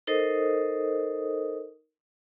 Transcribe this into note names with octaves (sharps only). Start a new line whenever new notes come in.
D#4 A4 A#4 C5 D#5 D#6